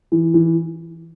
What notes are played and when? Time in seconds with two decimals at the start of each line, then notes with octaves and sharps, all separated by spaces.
0.12 E3
0.34 E3